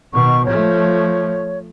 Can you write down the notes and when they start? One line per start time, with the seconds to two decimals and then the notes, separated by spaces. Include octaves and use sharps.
0.13 B2 D#3 C#6
0.46 F3 A3 C#5